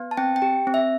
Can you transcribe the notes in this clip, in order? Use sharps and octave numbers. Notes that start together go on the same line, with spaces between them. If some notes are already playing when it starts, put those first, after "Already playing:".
Already playing: B3
A5
C4 G5
G5
G4
C4
E5